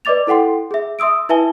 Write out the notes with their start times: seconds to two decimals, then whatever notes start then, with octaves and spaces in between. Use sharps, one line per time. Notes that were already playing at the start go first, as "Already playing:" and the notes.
0.05 B4 D5 D#5 D6 A6 F7
0.27 E4 A4 F#5 G5 C6
0.71 G#4 E5
0.99 E5 C6 D#6 E6 D7
1.29 E4 B4 E5 G#5 A5 G7